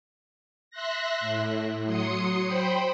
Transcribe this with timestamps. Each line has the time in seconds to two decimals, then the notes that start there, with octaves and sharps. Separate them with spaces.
0.70 E5 C6 F#6 A#6
1.20 A2
1.86 F#3 C6 D#6 C#7
2.46 C5 G5 B5 C6